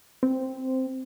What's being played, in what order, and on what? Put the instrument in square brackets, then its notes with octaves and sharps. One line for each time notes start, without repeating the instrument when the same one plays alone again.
[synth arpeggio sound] C4